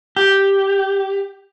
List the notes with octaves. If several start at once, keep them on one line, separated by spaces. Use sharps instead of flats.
G4